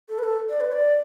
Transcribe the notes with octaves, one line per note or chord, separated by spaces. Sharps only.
A4
B4
A4
D5
B4
D5